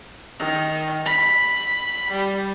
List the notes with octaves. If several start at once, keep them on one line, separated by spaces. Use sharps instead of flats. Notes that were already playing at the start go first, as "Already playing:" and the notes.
D#3
B5
G3